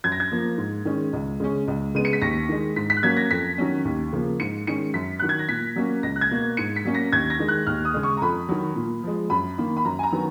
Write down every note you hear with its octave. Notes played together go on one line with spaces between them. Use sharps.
F#2 G#6
A#6
G#6
F3 A#3
G#2
D#3 G#3 C#4
C#2
C#3 G#3 C#4
C#2
C#3 G#3 B3 D#7
C#7
B6
D#2 A#6
D#3 G#3
G#2 B6
B6
F#6
F#3 A#3 C#4 G#6
A#6
F2 B6
D#3 F#3 C#4
D#2
C#3 F3 A#3
G#2 C#7
D#3 G#3 C#4 C#7
F#2 B6
D#3 F#3 F#6
G#6
A#6
A#2 B6
F#3 A#3 C#4
C#2 A#6
F#6
G#6
B2 A#3
G#2 C#7
B6
F#3 A#3 C#4
A#6
D#2 G#6
A#6
D#3 G#3
F#6
D#2 F6
D#6
C#3 G#3
C#6
A#5
F2 B5
D#3 F#3
A#2
F3 G#3
F#2 B5
D#3 A#3
B5
F#2 A#5
G#5
A#5
D#3 F#3 B3